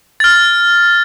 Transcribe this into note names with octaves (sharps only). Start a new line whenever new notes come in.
F6 A6